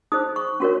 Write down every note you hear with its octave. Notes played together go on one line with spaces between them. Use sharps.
D#4 G#4 C5 D#6
C#6
C#4 F#4 A#4 C#5 C6